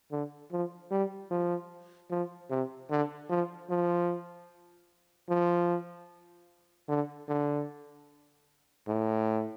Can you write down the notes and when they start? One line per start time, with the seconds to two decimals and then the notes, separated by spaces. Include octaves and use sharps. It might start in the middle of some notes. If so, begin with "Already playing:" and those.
0.12 D3
0.52 F3
0.91 G3
1.31 F3
2.10 F3
2.50 C3
2.90 D3
3.30 F3
3.70 F3
5.29 F3
6.89 D3
7.29 D3
8.88 A2